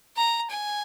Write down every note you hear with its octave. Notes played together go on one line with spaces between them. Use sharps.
A#5
G#5